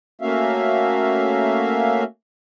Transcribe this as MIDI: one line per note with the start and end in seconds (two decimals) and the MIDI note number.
0.21 2.04 57
0.21 2.04 58
0.21 2.04 61
0.21 2.04 66
0.21 2.04 76
0.21 2.04 77